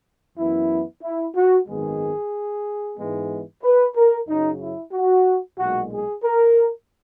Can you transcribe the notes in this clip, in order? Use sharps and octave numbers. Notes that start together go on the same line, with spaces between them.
F#2 E3 B3 E4
E4
F#4
G#1 F#2 D#3 G#3 B3 G#4
G#2 E3 G#3 B3
B4
A#4
F#2 C#3 F#3 D#4
E4
F#4
B1 A#2 G#3 F#4
G#4
A#4